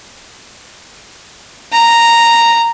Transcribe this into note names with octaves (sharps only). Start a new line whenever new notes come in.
A#5